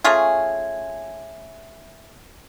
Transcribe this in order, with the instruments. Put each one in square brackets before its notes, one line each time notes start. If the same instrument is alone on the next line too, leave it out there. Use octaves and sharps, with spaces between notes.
[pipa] A3 C#4 F4 G#4